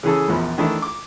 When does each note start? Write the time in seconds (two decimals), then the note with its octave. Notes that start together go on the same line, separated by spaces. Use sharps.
0.03 C#3 E3 G#4 A4
0.28 A#1 E2 F3 B5
0.58 D#3 E3 A3 D4 E4
0.82 D6